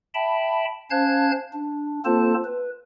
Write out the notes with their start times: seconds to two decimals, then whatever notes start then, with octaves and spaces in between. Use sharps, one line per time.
0.14 E5 G5 A5 B5
0.90 C#4 C5 F5 A5 F#6 G#6
1.53 D4
2.05 A#3 C4 F4 A4 C5 A5
2.44 B4